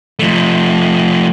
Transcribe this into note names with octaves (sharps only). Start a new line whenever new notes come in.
F3 A3